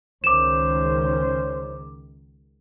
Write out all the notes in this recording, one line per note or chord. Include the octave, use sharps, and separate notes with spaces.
C#2 D#3 C#4 C5 D6 E7